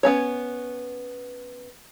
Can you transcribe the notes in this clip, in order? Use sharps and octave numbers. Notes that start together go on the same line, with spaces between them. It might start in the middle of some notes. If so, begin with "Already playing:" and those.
B3 C#4 C#5